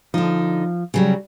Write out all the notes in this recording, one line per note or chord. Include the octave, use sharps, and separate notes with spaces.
D3 F3 D#4
C#3 F#3 G3